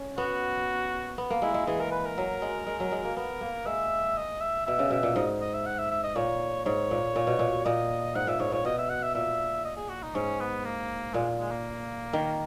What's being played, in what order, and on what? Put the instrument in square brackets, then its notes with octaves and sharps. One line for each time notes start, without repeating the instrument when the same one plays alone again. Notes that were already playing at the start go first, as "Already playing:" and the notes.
Already playing: [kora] C#4
[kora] B3 [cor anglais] F#4
[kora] B3
A#3
[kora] G#3 [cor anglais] E4
[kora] G#3
[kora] E3 [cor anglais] G#4
[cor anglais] A#4
B4
A#4
[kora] F#3
G#3
G#3
F#3
G#3
A#3
[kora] B3 [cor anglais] A#4
[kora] A#3
[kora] G#3 [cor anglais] E5
[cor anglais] D#5
E5
[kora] B2 [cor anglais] E5
[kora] C#3
[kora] B2 [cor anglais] E5
[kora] A#2
[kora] G#2 [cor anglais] D#5
[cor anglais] D#5
E5
F#5
E5
E5
D#5
[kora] A#2 [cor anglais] C#5
[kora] G#2 [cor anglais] C#5
[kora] A#2
A#2
B2
A#2
[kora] A#2 [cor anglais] D#5
[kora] G#2 [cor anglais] F#5
[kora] A#2 [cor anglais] E5
[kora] G#2 [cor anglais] C#5
[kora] A#2 [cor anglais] C#5
[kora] B2 [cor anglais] D#5
[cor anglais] E5
F#5
E5
[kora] A#2 [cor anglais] E5
[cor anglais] D#5
G#4
F#4
D#4
[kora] G#2 [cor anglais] C#4
[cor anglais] B3
A#3
[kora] A#2 [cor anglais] G#3
[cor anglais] G#3
A#3
[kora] D#3